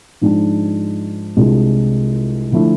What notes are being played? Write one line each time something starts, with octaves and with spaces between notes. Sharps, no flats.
G#2 F3 G#3 D4
C2 C3 G#3 D4 F4
D3 F3 A3 E4